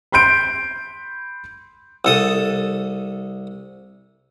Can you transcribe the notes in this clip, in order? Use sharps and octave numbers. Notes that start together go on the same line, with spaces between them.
B5 C6 G6 D7
C2 A4 D#6